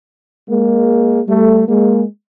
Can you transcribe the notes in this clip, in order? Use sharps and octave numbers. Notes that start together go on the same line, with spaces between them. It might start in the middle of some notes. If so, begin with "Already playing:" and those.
G#3 A#3
G3 A3
G#3 A#3